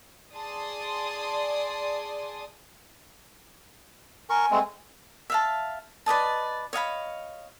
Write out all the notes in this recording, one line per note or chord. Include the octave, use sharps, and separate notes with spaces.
G#4 D5 G#5 A5 C6 D#6
A#4 G#5 C#6
G#3 A3 C4
E5 F5 A5
B4 D5 D#5 A5
C#5 D#5 F5 B5